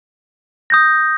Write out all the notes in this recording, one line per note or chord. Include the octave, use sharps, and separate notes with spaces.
D#6 G6 A#6